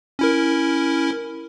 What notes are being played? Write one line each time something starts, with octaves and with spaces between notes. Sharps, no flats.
C#4 E4 A#4